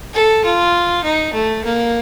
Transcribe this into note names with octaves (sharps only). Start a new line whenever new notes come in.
A4
F4
D#4
A3
A#3